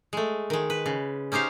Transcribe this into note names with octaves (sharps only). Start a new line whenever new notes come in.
G#3 A3
D#3 G#3
B4
C#3
C#4 D#4 G4 C5 F5